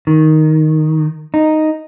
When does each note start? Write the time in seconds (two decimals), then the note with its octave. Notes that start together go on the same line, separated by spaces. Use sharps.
0.07 D#3
1.34 D#4